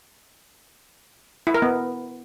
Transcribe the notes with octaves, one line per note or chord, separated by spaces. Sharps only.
E4
A#4
B3